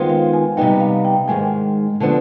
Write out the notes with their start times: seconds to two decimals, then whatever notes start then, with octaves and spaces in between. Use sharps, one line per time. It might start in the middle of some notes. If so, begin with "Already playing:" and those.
Already playing: D#3 G#3 B3 F4 C5
0.09 F5
0.33 G#5
0.57 C3 G3 B3 D#4 G5
0.80 F5
1.05 G5
1.28 G#2 D#3 G#3 G#5
2.00 D3 F3 B3 D4